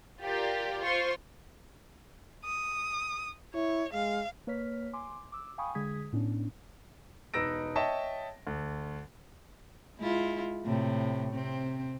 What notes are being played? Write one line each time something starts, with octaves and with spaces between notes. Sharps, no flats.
F4 G4 A#4 D5
F4 C5 C6 C#6
D#6
E4 C#5
G#3 F5
A#3 B4 C#5 F6 B6
G#5 C6 D6
D6 E6
F5 G5 G#5 B5 C#6 D#6
D3 G#3 G#4 D#6 G#6 B6
A2 B3 C#4 D4
E1 D#4 B4 E6 A#6 D7
C#5 D#5 E5 G5 A5
D2
G#3 E4 F4
A2 C3
C3 C4